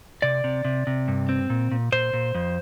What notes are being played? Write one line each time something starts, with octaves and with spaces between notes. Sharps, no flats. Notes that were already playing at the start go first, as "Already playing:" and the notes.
C3 D5
C3
C3
C3
G2
C4
A#2
A#2
A#2 C5
A#2
F2